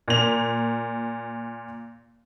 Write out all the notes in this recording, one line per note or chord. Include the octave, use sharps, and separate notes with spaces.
A#2 F7